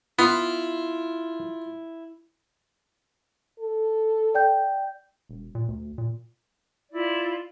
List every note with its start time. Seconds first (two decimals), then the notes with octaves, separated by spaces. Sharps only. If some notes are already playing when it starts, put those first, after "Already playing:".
0.19 B3 E4 F4
3.59 A4
4.34 D5 G5 G6
5.29 E1
5.55 A#2
5.68 D2
5.98 A#2
6.91 E4 F4 D5